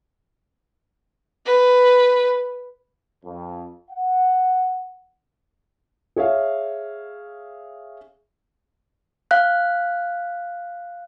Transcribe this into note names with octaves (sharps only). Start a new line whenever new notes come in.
B4
F2
F#5
G#4 C#5 E5 F5
F5 F#6